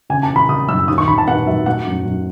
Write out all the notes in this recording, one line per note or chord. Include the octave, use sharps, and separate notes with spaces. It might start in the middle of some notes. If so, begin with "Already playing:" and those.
C#3 G#5
A5
E3
B5
C#3 D#6
F#2 E6
D#2 D#6
C#6
D#2 B5
A5
B3 F#5
F#3 E5
A3 F#5
F#2
F#2